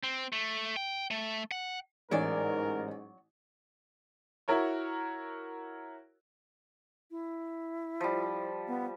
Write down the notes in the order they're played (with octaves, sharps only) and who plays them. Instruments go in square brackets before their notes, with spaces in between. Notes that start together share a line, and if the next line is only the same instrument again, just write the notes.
[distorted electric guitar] C4
A3
G5
A3
F#5
[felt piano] A1 D#4 G#5 [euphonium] G#2 [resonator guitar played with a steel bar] F#3 D5 [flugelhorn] A#4
[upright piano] E4 F#4 A#4 C#5
[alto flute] E4
[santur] F3 G3
[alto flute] B3